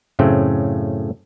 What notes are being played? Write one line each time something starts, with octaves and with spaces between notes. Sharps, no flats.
F#2 A2 C#3 A3 C4